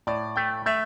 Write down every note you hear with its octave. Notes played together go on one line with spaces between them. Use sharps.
A2 D5
A3 G5
A3 E5